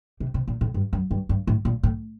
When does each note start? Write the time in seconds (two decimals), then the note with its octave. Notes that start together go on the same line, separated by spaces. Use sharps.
0.20 C3
0.34 C3
0.48 A#2
0.61 A2
0.74 G2
0.93 F#2
1.11 G2
1.29 G2
1.47 A2
1.65 A#2
1.83 A2